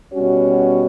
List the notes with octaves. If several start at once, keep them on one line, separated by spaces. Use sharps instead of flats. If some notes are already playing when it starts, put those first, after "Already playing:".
B2 G3 C#4 F#4 C#5